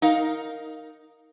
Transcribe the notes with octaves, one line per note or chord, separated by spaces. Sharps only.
D#4 A#4 F5